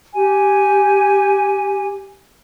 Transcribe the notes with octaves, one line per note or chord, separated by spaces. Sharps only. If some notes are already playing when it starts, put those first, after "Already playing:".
G4 G#5